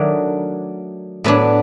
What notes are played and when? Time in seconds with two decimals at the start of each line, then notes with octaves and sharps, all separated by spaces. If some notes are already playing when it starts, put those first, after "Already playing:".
Already playing: D#3 F#3 A3 D4
1.24 A2 F#3 B3 D4